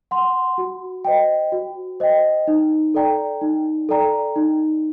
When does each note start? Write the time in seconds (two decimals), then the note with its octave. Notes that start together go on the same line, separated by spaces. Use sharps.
0.11 F#5 C6
0.58 F#4
1.05 C5 D#5 G5
1.52 F#4
2.00 C5 D#5 G5
2.48 D#4
2.94 A4 D5 G5 A#5
3.41 D#4
3.89 A4 D5 G5 A#5
4.36 D#4